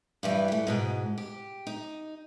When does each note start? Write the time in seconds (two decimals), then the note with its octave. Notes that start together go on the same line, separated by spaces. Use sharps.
0.23 G2 E3 G3
0.48 E3 A3
0.67 G#2 B2 G#3
1.18 G4
1.67 D#4